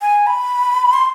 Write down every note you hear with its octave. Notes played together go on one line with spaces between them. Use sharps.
G#5
B5
C6